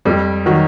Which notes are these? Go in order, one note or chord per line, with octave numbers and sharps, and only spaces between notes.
F2 G3
D#3 F#3